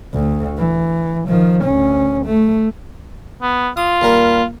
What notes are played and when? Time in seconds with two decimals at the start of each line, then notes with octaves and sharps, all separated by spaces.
0.13 D2
0.58 E3
1.28 D#3 F3
1.64 D2 C#4
2.26 A3
3.42 B3
3.77 F4 D#6
4.01 D#2 G3 A#4